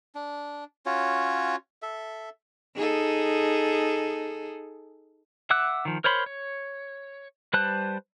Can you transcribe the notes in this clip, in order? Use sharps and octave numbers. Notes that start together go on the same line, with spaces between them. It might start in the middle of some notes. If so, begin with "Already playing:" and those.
D4
C#4 F4 F#4 C#5
A4 E5
D#4 G#4 A4
E5 F#5 D6 E6 F#6
D#3 F3
A#4 C5 C#5 B5 C6
C#5
G3 B4 C5 A5 F#6